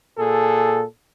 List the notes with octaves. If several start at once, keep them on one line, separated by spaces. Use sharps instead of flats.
A#2 G#4 A4